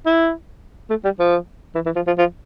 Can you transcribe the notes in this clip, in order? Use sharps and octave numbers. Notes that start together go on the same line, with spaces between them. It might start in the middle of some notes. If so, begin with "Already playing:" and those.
E4
A3
G3
F3
E3
E3
F3
F3
F3